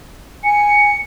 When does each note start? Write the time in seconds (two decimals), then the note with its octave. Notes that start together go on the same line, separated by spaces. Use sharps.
0.44 G#5 C#7